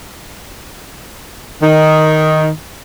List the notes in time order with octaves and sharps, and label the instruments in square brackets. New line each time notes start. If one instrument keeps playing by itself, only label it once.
[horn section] D#3